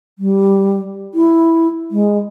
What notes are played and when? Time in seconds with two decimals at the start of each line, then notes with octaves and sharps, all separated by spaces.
0.19 G3
1.14 E4
1.91 G#3